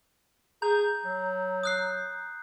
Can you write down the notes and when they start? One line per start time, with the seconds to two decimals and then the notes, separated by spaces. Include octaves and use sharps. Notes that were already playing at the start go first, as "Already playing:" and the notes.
0.62 G#4 A#5 G6
1.05 F#3
1.63 D#6 F#6 C7